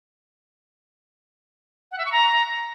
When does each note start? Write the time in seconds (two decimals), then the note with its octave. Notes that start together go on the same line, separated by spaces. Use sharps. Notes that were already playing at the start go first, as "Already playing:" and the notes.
1.92 F#5
1.98 E5
2.05 C#6
2.12 A#5